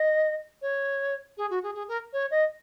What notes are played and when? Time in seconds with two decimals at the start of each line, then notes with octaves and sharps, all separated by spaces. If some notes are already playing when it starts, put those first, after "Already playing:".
Already playing: D#5
0.61 C#5
1.37 G#4
1.50 F#4
1.63 G#4
1.74 G#4
1.88 A#4
2.13 C#5
2.30 D#5